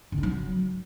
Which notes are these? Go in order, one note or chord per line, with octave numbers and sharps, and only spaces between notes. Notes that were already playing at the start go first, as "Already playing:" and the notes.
D3
D#4
F#3